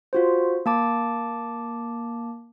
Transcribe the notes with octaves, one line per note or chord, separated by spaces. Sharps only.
F4 F#4 C5
A#3 A5 D6